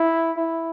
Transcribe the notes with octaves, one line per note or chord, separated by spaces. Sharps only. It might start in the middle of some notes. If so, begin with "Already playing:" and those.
Already playing: E4
E4